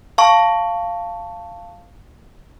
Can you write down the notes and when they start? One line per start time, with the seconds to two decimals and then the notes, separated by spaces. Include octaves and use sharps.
0.18 F5 A5 C#6